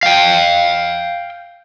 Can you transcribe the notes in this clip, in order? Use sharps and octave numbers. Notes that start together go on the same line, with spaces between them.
F5 G5